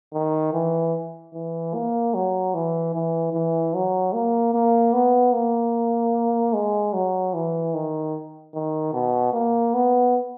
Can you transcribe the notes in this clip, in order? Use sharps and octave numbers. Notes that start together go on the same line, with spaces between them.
D#3
E3
E3
A#3
F#3
E3
E3
E3
F#3
A#3
A#3
B3
A#3
G#3
F#3
E3
D#3
D#3
B2
A#3
B3